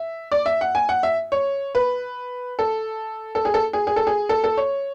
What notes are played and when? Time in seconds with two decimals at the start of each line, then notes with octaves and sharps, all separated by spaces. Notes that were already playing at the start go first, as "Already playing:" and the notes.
Already playing: E5
0.32 D5
0.46 E5
0.61 F#5
0.75 G#5
0.89 F#5
1.03 E5
1.32 C#5
1.75 B4
2.59 A4
3.35 A4
3.45 G#4
3.54 A4
3.73 G#4
3.87 G#4
3.96 A4
4.07 G#4
4.29 A4
4.44 A4
4.57 C#5